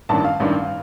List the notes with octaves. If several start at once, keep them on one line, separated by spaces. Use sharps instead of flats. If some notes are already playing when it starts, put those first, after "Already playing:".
A1 G2 D#3 A5
F5
A1 G2 D#3